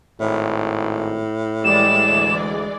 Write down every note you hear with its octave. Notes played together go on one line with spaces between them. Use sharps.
G#1 A2
E3 G3 G#3 D5 E7
D2